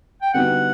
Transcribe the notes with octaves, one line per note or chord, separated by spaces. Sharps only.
G5
D3 G3 B3 D#4 F#4 F#5